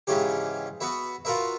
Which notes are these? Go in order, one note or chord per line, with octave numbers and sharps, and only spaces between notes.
G#2 C#3 E3 C#4 G4
B3 F#4 B4 E5
F4 F#4 A#4 B4 E5